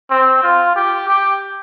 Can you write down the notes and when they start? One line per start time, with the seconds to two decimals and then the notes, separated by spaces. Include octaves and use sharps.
0.10 C4
0.43 F4
0.76 G4
1.08 G4